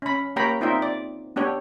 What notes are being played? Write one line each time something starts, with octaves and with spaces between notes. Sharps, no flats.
C#4 B5
A#3 G4 C#5 G5 A#5 B5
C4 D#4 F4 D5 E5 G5
D5
B3 D4 G4 C#5